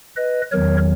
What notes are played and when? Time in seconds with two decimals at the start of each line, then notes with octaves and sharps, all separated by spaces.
0.16 B4 D#5
0.52 E2 D#3 F#3 A#4 C#5